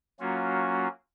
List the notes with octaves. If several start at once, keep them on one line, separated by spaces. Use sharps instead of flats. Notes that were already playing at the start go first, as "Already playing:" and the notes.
F#3 A#3 C#4 F4 F#4